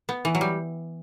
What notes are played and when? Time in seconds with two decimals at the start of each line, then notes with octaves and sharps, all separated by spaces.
0.09 B3
0.25 E3
0.35 F#3
0.41 G3